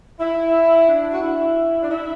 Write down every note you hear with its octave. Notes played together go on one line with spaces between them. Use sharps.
E4
D4
F#4
E4
D4
E4